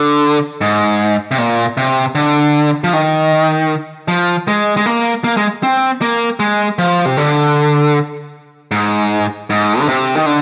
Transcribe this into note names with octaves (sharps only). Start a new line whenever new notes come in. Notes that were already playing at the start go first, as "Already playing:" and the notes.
Already playing: D3
G#2
C3
A#2
C3
D3
F3
D#3
F3
G#3
G#3
A#3
A#3
G#3
C4
A#3
G#3
F3
C3
D3
G#2
G#2
D3
C3
D#3
D3